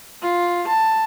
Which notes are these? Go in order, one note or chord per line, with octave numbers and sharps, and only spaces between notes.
F4
A5